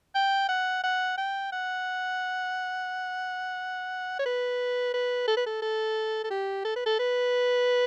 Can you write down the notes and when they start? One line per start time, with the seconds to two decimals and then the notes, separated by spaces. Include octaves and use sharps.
0.15 G5
0.49 F#5
0.83 F#5
1.18 G5
1.52 F#5
4.19 C#5
4.26 B4
4.94 B4
5.28 A4
5.37 B4
5.46 A4
5.62 A4
6.24 A4
6.30 G4
6.65 A4
6.76 B4
6.86 A4
6.99 B4